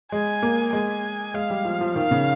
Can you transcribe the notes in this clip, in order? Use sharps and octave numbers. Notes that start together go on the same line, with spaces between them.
G#3 G#5
A#3
G#3 G#5
G#3 F5
G3
F3
F3
D#3 F5
C#3